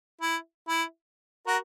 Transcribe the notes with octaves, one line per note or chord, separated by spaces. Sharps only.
E4
E4
F#4 A#4